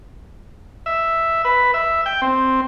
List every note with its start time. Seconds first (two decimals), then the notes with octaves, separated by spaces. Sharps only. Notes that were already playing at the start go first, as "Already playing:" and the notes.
0.86 E5
1.45 B4
1.74 E5
2.06 G5
2.22 C4